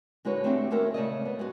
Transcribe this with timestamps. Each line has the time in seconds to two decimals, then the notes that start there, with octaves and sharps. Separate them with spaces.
0.25 D3 G#3 F#4 B4 C#5
0.44 A3 C4 D4 D#4 F#4 G4
0.71 D#2 G#3 C#4 A#4 E5
0.94 C#3 A3 D5 D#5
1.25 B3
1.39 G#3 B3 F#4